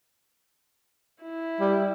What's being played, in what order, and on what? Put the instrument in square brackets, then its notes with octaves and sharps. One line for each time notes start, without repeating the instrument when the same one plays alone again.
[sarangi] E4
[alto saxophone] G3